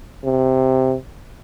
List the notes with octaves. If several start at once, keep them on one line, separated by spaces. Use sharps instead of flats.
C3